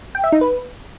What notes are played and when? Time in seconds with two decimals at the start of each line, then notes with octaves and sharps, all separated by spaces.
0.15 G5
0.24 E5
0.32 D#4
0.41 B4